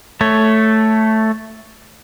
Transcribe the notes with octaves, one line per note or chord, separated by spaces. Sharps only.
A3 C#5